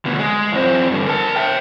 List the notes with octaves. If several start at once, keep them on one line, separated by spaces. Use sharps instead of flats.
D2 B2
G#3
E2 C4
G2 D3
A#4 A5
E5 G5